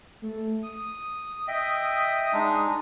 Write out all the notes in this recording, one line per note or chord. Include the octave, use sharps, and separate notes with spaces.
A3
D#6
D#5 E5 G5
G#3 D4 D#4